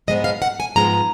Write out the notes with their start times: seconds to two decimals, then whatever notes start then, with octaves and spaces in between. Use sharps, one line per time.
0.07 G#2 F3 G#3 B3 D#5
0.24 F5
0.42 F#5
0.60 G#5
0.76 G#2 F3 G#3 B3 A#5